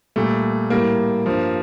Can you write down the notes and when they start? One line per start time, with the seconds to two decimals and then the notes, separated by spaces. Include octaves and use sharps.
0.16 A#2 G3 A3
0.70 A2 G3 A#3
1.26 G2 F3